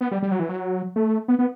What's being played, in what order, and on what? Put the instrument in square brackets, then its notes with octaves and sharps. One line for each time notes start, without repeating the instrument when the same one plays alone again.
[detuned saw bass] B3
G3
G3
F#3
E3
F#3
A3
B3
B3